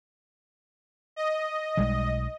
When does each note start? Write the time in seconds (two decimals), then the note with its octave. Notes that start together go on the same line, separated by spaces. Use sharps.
1.16 D#5
1.77 B1 G3 G#3